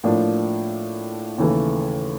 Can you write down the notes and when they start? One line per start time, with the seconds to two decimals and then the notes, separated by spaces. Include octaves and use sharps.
0.04 A2 F3 A#3 D4
1.38 D#2 C#3 E3 A3